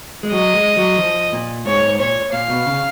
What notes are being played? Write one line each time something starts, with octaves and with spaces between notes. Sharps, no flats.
G#3
F#3 D#5
G#3
F#3
F3
A#2
G#2 C#5
G#2
A#2 C#5
A#2 F5
B2
C#3